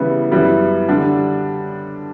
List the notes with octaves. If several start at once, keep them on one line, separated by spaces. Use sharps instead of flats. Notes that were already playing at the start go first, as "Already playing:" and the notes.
Already playing: C#3 E3 G3 B3 E4
F#2 E3 G3 B3 E4
D3 G3 D4